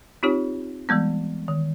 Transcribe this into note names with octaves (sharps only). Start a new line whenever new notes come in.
C4 D#4 F4 G4 C#5
E3 G3 G#3 B3
D#3